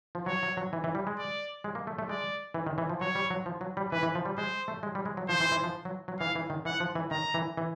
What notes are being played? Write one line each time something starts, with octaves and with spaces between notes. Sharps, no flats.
F3
F#3 C#5
F#3
F#3
E3
E3
G3
G#3
D5
G#3
A#3
A3
A3
G#3 D5
E3
D#3
E3
F3
F#3 C#5
G3
F#3
F3
F#3
G3
E3 B4
E3
F3
G3
G#3 C5
A3
G#3
G3
G#3
F#3
F3 C5
E3
E3
F3
F#3
F#3
E3 F5
E3
D#3
E3 F#5
F3
E3
D#3 A#5
E3
E3